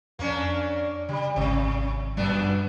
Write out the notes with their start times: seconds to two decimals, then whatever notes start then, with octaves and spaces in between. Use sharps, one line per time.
0.19 F2 A#3 C#4 D4
1.09 C#3 G3 B5
1.36 G#1 C3
2.17 G2 A#2 G3 B3 D4